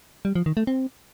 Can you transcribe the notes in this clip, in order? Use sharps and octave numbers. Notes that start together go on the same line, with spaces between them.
G3
F3
D#3
A3
C4